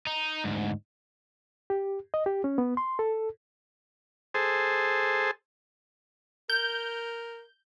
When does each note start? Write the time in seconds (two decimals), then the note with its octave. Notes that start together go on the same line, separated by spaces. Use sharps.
0.07 D#4
0.44 D2 G#2
1.70 G4
2.14 D#5
2.26 G4
2.44 C#4
2.58 B3
2.77 C6
2.99 A4
4.34 G#4 A4 C5
6.50 A#4 G6